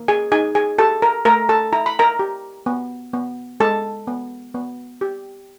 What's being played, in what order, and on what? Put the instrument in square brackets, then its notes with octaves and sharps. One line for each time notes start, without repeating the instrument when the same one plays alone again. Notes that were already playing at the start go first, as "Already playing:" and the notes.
Already playing: [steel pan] A#3
G#4 G#5
D#4 G#4 G#5
G#4 G#5
G4 A4 A5
A#4 A#5
A3 A#4 A#5
A4 A5
E4 A#5
B5
A#4 A#5
G4
B3
B3
G#3 A4 A5
B3
B3
G4